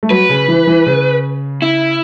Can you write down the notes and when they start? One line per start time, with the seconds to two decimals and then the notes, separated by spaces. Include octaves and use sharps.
0.03 A3
0.10 F#3 B4
0.29 C#3
0.48 E3
0.67 E3
0.87 C#3
1.62 E4